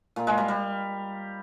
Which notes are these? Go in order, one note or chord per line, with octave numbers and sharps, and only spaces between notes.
A#2
G#3
G3
G3